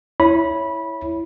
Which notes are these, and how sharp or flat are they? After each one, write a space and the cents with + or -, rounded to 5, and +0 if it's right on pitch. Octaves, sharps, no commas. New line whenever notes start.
E4 +0 C#5 +0 B5 -20